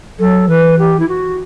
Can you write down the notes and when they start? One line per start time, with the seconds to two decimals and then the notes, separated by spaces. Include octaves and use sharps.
0.19 F#3 A4
0.48 E3 B4
0.78 G4
0.99 E4
1.08 F#4